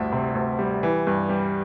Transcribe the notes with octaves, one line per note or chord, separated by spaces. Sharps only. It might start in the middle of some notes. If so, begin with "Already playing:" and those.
Already playing: A1 D2 G2 E5
C3
D2
G3
E3
G2
G3